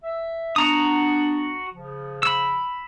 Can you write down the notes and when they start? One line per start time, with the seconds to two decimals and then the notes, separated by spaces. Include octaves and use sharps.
0.04 E5
0.56 B3 D4 F#4 A#5 D#6
1.74 C#3 F3
2.23 B5 E6